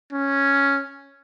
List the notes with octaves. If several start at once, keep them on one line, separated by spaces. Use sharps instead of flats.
C#4